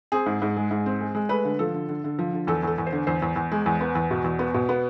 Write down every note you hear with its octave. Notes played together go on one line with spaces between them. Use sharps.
C4 G#4
G#2
G#2
G#3
G#2
C4
G#3
G#3
A3 B4
D3
F3 A4
D3
D3
D3
F3
D3
E2 A4
E2 A4
E2
C5
D3
E2 C5
E2
E2
G#3
E2
B3
E2
B2
E2
B3
B2
B3